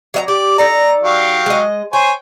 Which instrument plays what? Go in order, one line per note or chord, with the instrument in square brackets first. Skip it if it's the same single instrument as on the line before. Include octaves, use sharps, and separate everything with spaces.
[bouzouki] F#3 D#5 A#5
[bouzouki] G4 [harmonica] D5
[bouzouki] D#4 A4 D5 [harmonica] A#5
[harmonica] F#3 G4 F5
[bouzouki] G#3 D#5
[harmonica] C5 C#5 G#5 [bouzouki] G5